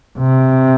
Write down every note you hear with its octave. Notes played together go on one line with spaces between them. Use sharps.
C3